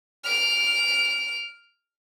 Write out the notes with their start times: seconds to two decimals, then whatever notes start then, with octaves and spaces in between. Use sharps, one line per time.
0.24 F6 D7